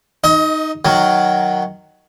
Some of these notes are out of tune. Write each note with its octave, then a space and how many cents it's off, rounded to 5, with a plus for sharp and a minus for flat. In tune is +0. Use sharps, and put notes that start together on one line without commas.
D#4 +0 D#5 +30
D#3 -5 F#3 +0